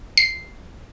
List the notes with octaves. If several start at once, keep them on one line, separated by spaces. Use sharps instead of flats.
C7